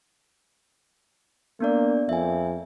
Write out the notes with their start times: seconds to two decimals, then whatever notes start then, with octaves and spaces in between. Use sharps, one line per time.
1.60 A#3 B3 D4 D5
2.09 F2 E5 G#5